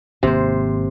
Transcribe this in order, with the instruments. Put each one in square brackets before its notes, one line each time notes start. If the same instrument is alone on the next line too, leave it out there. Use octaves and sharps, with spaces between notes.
[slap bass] G#1 G#2 A#3 [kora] C3 C5